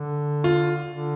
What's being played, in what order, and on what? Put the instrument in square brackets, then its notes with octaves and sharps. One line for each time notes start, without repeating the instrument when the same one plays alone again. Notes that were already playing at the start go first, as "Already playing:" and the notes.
Already playing: [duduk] D3
[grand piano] F4
[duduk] D3